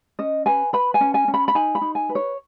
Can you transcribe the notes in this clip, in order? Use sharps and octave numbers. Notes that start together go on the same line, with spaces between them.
C#4 D#5
B4 G#5
B4 B5
G#5
C#4
G#5
C#4
B5
B5
D#4 G#5
B5
D#4
G#5
B4
C#5